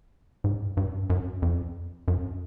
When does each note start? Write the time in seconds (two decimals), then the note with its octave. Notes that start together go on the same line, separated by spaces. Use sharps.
0.44 G#2
0.77 G2
1.10 F#2
1.42 F2
2.08 F#2